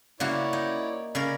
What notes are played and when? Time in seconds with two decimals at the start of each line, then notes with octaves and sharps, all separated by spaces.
0.20 C#3 A#3 E4 F#4 C#5 D5
0.53 D#4
1.15 C#3 C#4 A#4 D5 B5